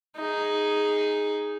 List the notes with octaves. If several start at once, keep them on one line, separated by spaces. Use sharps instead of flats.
D#4 G#4